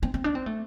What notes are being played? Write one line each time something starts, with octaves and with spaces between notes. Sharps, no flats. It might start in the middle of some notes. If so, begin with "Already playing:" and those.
C4
C4
D4
C4
A3